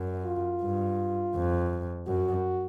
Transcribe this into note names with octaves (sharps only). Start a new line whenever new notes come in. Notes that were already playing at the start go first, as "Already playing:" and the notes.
Already playing: F#2
F4
G2
F2
F#2 F#4